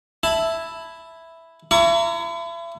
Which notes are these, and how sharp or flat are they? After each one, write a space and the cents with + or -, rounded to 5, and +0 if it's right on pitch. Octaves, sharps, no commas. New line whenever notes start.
E4 +0 A5 +0
E4 +40 A#5 -10 C#6 +35